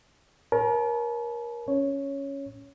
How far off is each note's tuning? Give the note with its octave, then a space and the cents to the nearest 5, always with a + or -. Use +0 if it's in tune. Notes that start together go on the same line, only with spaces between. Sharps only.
A#4 +25 C#5 -35 A5 -40
C#4 +0 C#5 +0